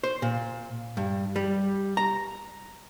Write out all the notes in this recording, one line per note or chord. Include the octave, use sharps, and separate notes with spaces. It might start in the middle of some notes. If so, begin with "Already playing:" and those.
C5
A#2
G2
G3
A#5